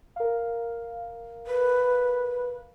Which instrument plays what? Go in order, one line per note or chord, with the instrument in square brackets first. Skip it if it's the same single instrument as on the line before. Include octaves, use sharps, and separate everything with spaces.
[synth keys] A#4 F5
[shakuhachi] B4